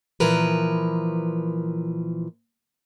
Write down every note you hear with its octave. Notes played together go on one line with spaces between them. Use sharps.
A#2 E3 F3 A#4 B4